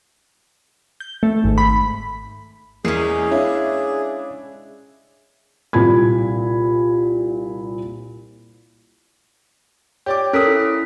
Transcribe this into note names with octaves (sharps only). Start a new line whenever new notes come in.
G6
A3
G#1
B5
E2 G#3 A#3 C#4 G#4 C7
D4 E4 C#5 F5
C2 A#2 C4 B5 G#6
G4 C#5 D5 D6
C#4 A4 A#4 D#6 B6
E4